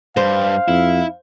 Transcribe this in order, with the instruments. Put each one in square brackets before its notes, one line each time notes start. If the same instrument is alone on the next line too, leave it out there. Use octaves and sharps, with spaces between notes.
[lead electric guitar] G2 [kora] C5 [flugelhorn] F5
[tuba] F2 [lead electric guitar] E4